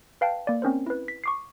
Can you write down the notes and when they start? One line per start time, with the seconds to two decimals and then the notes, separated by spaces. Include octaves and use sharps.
0.21 B4 F5 G5 A5
0.47 A#3 D5
0.62 C4 C#4 A#4 C5
0.87 E4 B4
1.08 B6
1.24 C#6 D6 C7